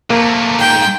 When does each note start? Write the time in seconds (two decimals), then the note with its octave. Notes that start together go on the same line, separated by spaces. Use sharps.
0.10 C3 A3 A#3 A#4
0.59 G#2 G5